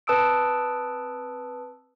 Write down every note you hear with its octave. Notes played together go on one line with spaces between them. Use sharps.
C4 B4 A5 D#6 E6 D7